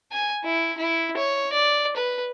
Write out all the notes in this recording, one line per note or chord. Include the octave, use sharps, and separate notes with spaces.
G#5
E4
E4
C#5
D5
B4